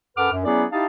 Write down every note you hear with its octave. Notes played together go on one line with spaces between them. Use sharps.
F#2 A4 B4 F#5 D6 F6
F#2
F#3 B3 C#4 E4 G#4 D5
D#4 E4 G4 F5 A5